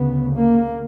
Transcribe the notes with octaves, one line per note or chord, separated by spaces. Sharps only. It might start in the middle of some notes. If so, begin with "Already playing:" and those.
Already playing: D2 C#3 B3
A#3